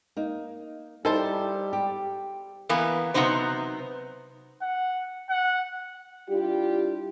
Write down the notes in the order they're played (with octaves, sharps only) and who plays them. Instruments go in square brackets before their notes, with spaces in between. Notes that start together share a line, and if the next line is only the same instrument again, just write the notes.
[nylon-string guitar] A#3 D#4
[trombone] G3 [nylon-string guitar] D#4 E4 [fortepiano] A4 C5 A5
[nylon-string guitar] G4
[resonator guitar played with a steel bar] E3 A#3 B3
C3 F#3 B3 D#4 C5
[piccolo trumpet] F#5
F#5
[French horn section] G3 D4 E4 F4 G4